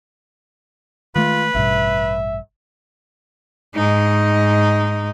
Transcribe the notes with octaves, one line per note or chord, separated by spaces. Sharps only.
D#3 G#3 A3 F4 B4
A1 G2 B2 E5
G#2 D#4